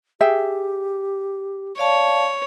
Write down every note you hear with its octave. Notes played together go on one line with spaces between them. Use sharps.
G4 G#4 E5 G5
C#5 D5 F5 A5